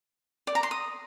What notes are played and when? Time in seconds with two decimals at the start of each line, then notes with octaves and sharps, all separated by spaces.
0.47 D5
0.55 A#5
0.63 C6
0.71 D#6